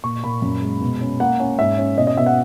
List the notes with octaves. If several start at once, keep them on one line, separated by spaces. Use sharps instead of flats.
A#2 C#6
A#2 B5
F#2
G#3
B2
C#4
A#3 F#5
C#4
G#2 E5
C#4
B2 D#5
D#5
B2 E5
F#5